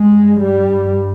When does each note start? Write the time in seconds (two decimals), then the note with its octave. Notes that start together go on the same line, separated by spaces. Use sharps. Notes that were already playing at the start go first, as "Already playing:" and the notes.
Already playing: G2 G#3
0.43 G3